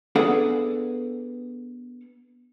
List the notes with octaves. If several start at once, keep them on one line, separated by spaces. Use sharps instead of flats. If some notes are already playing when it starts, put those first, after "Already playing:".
B3 D4 G#4 A4 F5 F#5